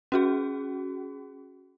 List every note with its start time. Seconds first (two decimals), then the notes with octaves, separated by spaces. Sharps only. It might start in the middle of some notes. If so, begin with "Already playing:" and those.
0.12 C#4 F#4 G#4